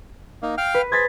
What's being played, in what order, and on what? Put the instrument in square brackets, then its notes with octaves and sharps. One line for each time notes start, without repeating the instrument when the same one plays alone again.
[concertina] A#3 D#4
F5 G5 F6
[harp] B4
[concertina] G#4 C5 [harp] G#6 A6 B6